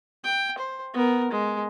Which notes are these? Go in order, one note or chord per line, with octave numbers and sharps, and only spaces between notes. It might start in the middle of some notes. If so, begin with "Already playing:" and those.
G5
C5
B3 A#4
G#3